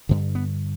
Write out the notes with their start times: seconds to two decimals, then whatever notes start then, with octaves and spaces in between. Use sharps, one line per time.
0.09 G2 D3
0.35 B3